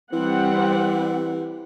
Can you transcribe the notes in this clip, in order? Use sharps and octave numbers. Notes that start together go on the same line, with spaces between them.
E3 G3 C4 F#5